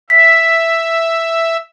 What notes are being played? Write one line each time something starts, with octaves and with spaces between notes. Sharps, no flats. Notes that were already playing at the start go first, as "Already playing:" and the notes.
E5 B6